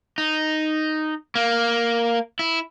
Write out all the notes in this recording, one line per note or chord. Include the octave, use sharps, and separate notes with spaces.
D#4
A#3
E4